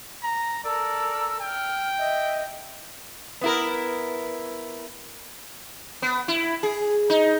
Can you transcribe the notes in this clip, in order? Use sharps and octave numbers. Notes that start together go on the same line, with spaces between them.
A#5
A4 A#4 D5 E6
G5 F6
D#5 E5
B3 E4 A#4
B3
E4
G#4
D#4